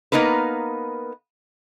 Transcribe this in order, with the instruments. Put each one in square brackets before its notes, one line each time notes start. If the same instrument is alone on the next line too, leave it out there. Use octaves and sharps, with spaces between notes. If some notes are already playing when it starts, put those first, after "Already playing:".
[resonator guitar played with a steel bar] A#3 B3 D#4 A#4 B4